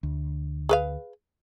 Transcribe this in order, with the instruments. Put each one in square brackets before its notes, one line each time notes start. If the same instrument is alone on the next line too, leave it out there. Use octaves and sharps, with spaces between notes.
[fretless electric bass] D2
[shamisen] G#4 B4 F5